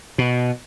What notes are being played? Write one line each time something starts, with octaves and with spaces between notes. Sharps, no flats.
B2